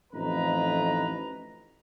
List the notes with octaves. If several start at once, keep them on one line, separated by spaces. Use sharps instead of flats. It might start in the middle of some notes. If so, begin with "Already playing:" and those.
A1 F2 D#4 B4 A#5